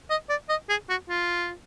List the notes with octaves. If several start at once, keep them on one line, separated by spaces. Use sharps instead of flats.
D#5
D5
D#5
G#4
F#4
F4